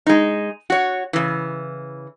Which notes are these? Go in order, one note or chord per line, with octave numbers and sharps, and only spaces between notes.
G#3 D#4
F#4 C#5
C#3 E3